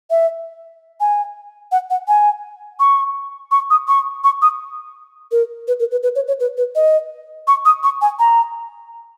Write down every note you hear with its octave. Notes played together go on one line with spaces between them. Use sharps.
E5
G#5
F#5
F#5
G#5
C#6
C#6
D#6
C#6
C#6
D#6
A#4
B4
A#4
B4
B4
C#5
C#5
B4
B4
D#5
C#6
D#6
C#6
G#5
A#5